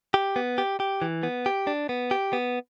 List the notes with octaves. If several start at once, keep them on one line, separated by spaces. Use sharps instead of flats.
G4
B3
G4
G4
E3
B3
G4
D4
B3
G4
B3